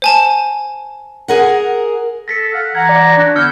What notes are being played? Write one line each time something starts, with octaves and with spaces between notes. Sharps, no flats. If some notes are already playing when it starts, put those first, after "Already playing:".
C5 G#5 A5
G#4 A#4 F#5
A4 A#6 B6 C#7
A4 F5 F#5
E3 F#5 A#5 G#6
D5
D4 F#4
D3 B3 E4 E6 F6 G6 C#7